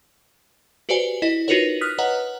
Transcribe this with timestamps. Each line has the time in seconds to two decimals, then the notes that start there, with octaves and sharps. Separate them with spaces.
0.89 F#4 G4 B4 C5 D5 G#5
1.22 E4 D#5
1.48 D#4 F4 F#4 A#4 B4 C#5
1.81 D#6 F6 F#6 B6
1.98 B4 C#5 D#5 F#5 A#5